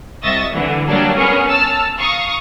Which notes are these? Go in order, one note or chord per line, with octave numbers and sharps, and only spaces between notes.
C2 D#5 E5 C#6 A6 A#6
D3 E3
F#3 G3 A#3 D4
B3 C#4 G#4 A#4
A5 E6 F6
F5 A#5 C#6 D#6